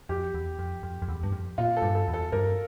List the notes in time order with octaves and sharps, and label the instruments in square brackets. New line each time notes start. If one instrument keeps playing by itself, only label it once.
[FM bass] F2 [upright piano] G4
[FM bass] E2
F2
F2
F2
E2
G2
F2
[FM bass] A#2 [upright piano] F4
[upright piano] A4
[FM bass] G2
[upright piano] A4
[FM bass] E2
[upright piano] A4
[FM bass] G2 [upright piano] A#4